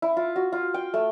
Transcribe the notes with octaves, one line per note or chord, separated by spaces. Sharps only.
E4
F4
F#4
F4
G5
A3